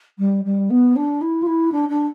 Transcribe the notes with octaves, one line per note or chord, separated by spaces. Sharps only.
G3
G3
B3
D4
E4
F4
E4
D4
D4